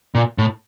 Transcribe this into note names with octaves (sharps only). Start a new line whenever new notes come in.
A#2
A2